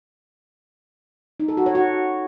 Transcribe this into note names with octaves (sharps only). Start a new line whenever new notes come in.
D#4
A4
F#4
C#5
F#4